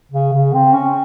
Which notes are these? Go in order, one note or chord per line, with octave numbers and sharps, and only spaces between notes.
C#3
C#3
C4
C#4